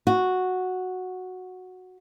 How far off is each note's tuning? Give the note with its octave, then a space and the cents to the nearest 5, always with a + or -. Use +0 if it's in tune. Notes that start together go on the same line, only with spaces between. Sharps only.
F#4 -5